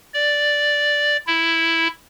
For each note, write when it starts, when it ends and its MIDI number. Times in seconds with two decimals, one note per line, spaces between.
0.14 1.17 74
1.27 1.88 64